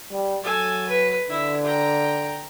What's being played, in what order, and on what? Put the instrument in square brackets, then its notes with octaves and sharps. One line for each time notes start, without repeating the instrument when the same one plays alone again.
[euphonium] G3
[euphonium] F#3 [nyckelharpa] A4 G#5
[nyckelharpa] B4
[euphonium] D3 [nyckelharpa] E4
[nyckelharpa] G5 A#5